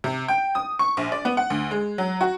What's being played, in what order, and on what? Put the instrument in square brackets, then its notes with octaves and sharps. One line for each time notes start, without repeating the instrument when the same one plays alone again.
[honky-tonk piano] C3
G5
D#6
C#6
A#1
D5
B3
F#5
D2
G#3
F#3
F#4